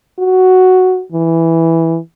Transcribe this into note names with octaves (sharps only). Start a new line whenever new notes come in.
F#4
E3